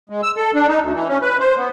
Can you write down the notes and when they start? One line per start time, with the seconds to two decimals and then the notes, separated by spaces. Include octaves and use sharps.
0.10 G#3
0.23 E6
0.37 A4
0.54 D4
0.68 D#4
0.81 D2
0.94 E3
1.09 C#4
1.22 B4
1.40 C5
1.57 B3